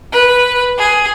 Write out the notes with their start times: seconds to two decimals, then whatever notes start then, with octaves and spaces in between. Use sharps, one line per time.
0.12 B4
0.78 G#4